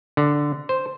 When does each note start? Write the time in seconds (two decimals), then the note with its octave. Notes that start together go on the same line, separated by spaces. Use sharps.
0.17 D3
0.69 C5